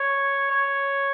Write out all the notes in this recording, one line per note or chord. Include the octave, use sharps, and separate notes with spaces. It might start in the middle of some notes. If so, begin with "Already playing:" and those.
Already playing: C#5
C#5